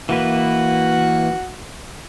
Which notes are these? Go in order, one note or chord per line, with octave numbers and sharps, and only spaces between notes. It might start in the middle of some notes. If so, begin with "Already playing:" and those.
E3 A#3 F#4 B4